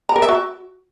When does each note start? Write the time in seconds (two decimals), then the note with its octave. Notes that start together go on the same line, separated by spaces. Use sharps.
0.09 A#5
0.16 A#4
0.22 E5
0.29 F#4